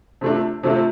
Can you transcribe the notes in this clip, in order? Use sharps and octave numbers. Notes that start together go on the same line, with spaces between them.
C3 F3 A3 D4
C3 F3 A3 D4